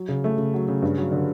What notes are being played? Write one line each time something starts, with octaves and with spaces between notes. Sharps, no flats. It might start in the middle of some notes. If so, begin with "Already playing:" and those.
Already playing: F#3
C#3
A3
C#3
F#3
C#3
G2
F#3
D3